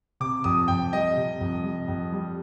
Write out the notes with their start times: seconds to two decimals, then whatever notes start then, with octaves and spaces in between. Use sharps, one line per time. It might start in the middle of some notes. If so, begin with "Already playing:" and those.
0.20 C3 D6
0.44 F2 D#6
0.68 F2 G5
0.93 G3 D#5
1.17 C3
1.41 F2
1.64 G3
1.88 F2
2.12 G3